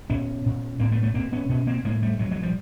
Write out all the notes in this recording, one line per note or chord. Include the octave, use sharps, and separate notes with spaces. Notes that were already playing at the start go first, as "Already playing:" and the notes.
A#2 B3 C#4
A#2
A2 A#3 C4
A3 B3
A3 B3
A#2 A#3 C4
B3 C#4
B2 B3 C#4
A#3 C4
A2 G#3 A#3
G3 A3
A#2 F#3 G#3
F#3 G#3
F3 G3